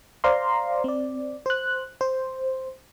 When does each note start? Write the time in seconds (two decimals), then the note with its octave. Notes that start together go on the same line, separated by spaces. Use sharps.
0.24 C5 D5 F5 A#5 C6
0.84 C4 D5
1.46 C5 F#6
2.01 C5